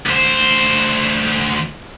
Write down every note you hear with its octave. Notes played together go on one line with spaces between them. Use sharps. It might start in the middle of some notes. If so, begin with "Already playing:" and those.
D2 C5